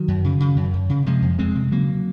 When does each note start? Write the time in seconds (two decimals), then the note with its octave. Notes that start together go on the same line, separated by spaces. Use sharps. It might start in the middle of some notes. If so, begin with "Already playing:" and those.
Already playing: D#3 F#3
0.08 F#2
0.24 C#3
0.40 C#3
0.56 F#2
0.74 F#2
0.90 C#3
1.06 C3 F3 G#3
1.22 F2
1.39 F2 G#3 C4
1.55 C3
1.71 C#3 F#3 A#3